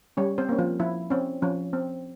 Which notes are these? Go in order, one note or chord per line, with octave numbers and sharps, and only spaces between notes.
G3 C#4 C#5
C4 C5
A#3 C#4
F3 F4
F3 E4
C4 C#4
F3 C#4
C4